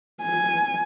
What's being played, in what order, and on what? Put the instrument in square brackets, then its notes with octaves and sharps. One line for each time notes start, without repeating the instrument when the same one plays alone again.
[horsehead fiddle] G#5